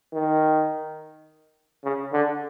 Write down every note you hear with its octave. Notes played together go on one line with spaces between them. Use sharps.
D#3
C#3
D3